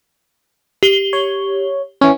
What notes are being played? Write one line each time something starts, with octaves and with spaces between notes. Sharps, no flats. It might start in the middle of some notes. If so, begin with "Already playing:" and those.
G4 G7
C#5
E3 C#4